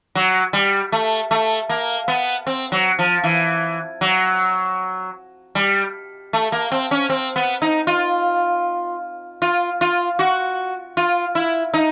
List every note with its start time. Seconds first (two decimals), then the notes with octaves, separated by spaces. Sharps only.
0.15 F#3
0.53 G3
0.92 A3
1.31 A3
1.69 A#3
2.08 B3
2.47 C4
2.72 F#3
2.99 F3
3.24 E3
4.01 F#3
5.55 G3
6.33 A3
6.52 A#3
6.72 C4
6.91 C#4
7.09 C4
7.36 B3
7.62 D#4
7.87 F4
9.42 F4
9.81 F4
10.19 F#4
10.97 F4
11.35 E4
11.74 D#4